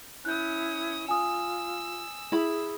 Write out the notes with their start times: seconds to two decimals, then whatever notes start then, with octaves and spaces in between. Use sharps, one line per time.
0.25 C#4 E4 D#6 F#6 G6
1.08 F4 G#5 D#6 E6
2.32 E4 G#4 B5